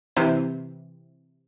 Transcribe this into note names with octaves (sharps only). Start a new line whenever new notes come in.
C3 E3